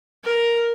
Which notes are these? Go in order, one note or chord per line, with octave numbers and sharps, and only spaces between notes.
A#4